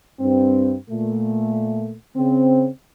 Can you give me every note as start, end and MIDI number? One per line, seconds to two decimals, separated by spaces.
0.20 0.75 43
0.20 0.75 60
0.89 1.94 46
0.89 1.94 57
2.15 2.68 49
2.15 2.68 60